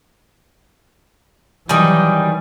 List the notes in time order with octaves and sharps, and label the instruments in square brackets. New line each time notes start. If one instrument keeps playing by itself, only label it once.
[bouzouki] D#3 G#5 [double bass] E3 F#3 [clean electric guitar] G3